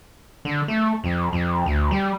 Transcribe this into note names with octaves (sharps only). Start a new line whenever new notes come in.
D3
A3
F2
F2
D2
G3